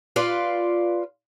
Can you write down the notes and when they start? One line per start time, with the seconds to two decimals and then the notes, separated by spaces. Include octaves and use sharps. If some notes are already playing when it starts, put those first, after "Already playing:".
0.16 F4 B4 D5 F5